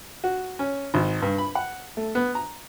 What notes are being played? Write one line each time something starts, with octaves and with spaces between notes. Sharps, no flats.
F#4
C#4
G#1
G2
B5
F#5
A3
B3
A#5